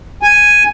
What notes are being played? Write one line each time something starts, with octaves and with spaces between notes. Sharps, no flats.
G#5